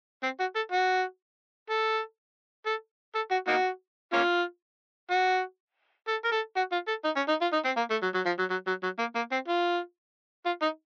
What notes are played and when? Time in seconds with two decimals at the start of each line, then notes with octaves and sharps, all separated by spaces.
0.23 C4
0.40 F#4
0.55 A4
0.72 F#4
1.70 A4
2.66 A4
3.15 A4
3.31 F#4
3.48 A#3 D#4 F#4
4.13 A#3 C#4 F4
5.10 F#4
6.08 A4
6.24 A#4
6.32 A4
6.56 F#4
6.72 F4
6.88 A4
7.05 D#4
7.16 C#4
7.28 D#4
7.41 F4
7.53 D#4
7.65 C4
7.77 A#3
7.90 A3
8.02 F#3
8.15 F#3
8.26 F3
8.39 F#3
8.50 F#3
8.67 F#3
8.83 F#3
8.99 A#3
9.15 A#3
9.32 C4
9.48 F4
10.46 F4
10.62 D#4